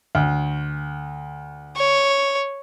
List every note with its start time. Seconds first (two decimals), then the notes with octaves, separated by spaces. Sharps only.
0.15 D2
1.77 C#5